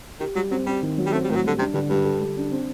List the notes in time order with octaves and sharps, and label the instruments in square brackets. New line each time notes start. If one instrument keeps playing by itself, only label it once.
[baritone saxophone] D#3 [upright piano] G4
[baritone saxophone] F#3 [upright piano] G3
[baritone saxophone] F#3 [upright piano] C4
[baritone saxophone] G3 [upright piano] C4
[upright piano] D#3
F#3
[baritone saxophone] G3
[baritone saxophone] A3 [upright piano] C4
[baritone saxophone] G3
[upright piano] A2 [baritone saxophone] D#3
[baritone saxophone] F#3
[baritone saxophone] D3 [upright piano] G3
[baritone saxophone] C3 [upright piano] D4
[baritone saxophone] G2 [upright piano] D3
[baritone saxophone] G2 [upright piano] G3
[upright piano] A4
G3
D4
C4